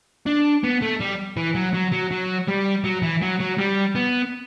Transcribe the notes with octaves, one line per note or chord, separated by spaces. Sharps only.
D4
B3
A3
G3
E3
F#3
F#3
F#3
F#3
G3
F#3
E3
F#3
F#3
G3
B3